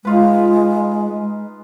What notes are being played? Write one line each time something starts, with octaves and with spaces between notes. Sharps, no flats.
G#3 D#4 F4 B4